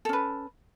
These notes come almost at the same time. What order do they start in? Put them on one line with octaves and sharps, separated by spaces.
A4 C#4 B4